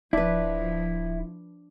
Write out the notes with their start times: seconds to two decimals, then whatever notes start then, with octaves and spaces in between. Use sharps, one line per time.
0.13 D1 F3 D4 E4 B4